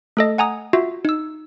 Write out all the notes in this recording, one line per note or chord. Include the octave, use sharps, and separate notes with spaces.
A3 A4 D#5
F#5 G#5 A#5 D#6
F4 F#4 E5
D#4 E6